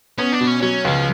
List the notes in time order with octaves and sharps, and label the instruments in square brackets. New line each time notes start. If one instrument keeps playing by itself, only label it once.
[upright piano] B3 [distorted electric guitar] C#4
[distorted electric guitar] D4
[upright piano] B2
[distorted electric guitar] C#4
[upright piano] F#3 [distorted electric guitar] C#4
[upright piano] C#2 [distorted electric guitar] F3